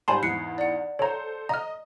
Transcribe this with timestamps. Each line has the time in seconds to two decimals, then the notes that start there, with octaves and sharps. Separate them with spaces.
0.08 G#2 G3 C5 G#5 A5 B5 C6
0.23 E2 G#2 F#6 C7 C#7
0.58 D5 F#5
0.99 A4 C5 C#5 A#5
1.49 D#5 A#5 F6